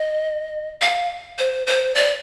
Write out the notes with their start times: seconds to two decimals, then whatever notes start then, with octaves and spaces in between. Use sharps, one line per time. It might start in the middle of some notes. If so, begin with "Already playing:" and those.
Already playing: D#5
0.82 F5
1.38 C5
1.67 C5
1.95 D5